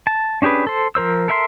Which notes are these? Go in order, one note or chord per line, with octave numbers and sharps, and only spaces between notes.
A5
C#4 D4 G4 G#4 B4
A4 C5
F3 A#4 C5 E6
A4 A#4 E5 G5 C6